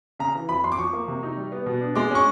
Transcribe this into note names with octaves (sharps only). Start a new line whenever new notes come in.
C#3 A#5
E3
F2 B5
F2 C6
D6
F3 C#6
A#3
C3
D#4
G3
B3
B2
D4
G#3 D6
C#4 C#6